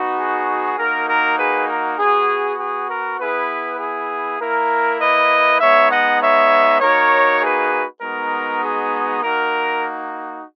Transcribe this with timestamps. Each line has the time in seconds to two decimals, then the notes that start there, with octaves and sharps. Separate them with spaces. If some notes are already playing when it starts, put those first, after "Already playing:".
Already playing: B3 D#4 F#4
0.18 G#4
0.77 A#3 D#4 F#4 A#4
1.08 A#4
1.37 G#4 B4
1.67 A#4
1.98 B3 F#4 G#4
2.58 G#4
2.89 A#4
3.18 B3 E4 G#4 B4
3.78 G#4
4.40 A#3 E4 A#4
5.00 B4 D#5
5.59 G#3 B3 D#4 C#5 E5
5.90 D#5 F#5
6.20 C#5 E5
6.80 A#3 D#4 F#4 A#4 C#5
7.41 G#4 B4
8.01 G#3 B3 D#4 F#4 A#4
8.62 G#4
9.21 A#3 D#4 F#4 A#4